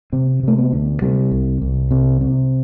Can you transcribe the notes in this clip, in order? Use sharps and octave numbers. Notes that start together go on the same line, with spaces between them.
C3 C4
C3 A3
B3
D2
C3 G3
C2
C2
C3
C3